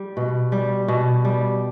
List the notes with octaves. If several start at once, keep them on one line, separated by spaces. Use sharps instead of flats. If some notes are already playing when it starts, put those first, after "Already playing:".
Already playing: G3
B2
G3
B2
G3